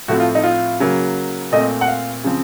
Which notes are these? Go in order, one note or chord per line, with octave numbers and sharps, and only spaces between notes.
A2 F3 A3 C4 F#4
F4
D#4
F4
C#3 F#3 A#3
A#2 A3 C4 D#5
F#5
F5
C#3 F3 C4